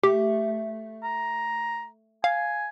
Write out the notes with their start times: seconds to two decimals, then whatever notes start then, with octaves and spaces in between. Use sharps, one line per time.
0.03 A3 G4
1.03 A#5
2.24 F5 G#5